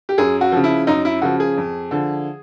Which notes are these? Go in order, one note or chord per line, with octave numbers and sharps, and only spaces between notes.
G4
F#2 G#4
F#4
C#3 F3
E4
F#2 D#4
E4
C#3 F3 F#4
G#4
F2
D3 F3